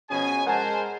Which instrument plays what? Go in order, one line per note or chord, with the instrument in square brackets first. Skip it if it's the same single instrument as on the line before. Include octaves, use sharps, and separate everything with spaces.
[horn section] B2 F3 G#4 [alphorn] C#4 [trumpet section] G#5
[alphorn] G#3 [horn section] A#4 [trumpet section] C5 [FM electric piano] F#5 G#5 A5